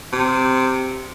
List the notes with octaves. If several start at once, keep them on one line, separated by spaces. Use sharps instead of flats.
C3